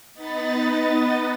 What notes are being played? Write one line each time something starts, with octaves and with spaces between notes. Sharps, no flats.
B3 D#4 B4 D#5 A6